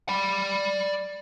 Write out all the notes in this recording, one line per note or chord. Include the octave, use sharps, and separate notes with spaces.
D5 B5